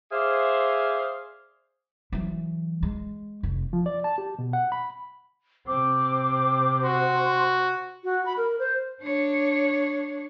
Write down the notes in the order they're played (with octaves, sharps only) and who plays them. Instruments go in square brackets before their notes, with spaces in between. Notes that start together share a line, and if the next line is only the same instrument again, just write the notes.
[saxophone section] G#4 C5 D5 E5 F5
[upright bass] E3 F#3
G#3
F1
[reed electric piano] F3
D5
A5
G4
B2
F#5
B5
[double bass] C3 C4 [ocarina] D6
[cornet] F#4 [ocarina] C6
[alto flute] F#4
B5
A#4
C5
[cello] D4 C#5